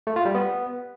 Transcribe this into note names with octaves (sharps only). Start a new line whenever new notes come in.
A3
F4
G3
B3